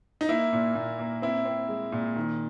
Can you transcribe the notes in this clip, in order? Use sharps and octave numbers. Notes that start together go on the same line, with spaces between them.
D#4
A#3 E4
A#2
A#2
A#3
C4 E4
C4
G#3
A#2
D#3